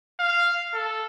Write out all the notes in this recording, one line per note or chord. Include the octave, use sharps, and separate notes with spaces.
F5
A4